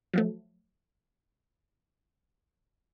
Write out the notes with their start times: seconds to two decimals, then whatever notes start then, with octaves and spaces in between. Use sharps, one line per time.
0.13 F3 F#3 A3